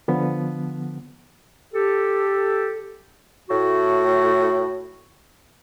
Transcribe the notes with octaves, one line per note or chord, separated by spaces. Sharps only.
D3 F3 B3
G4 A4
A2 F#4